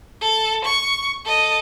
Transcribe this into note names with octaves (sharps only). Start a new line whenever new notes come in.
A4
C#6
A4 D#5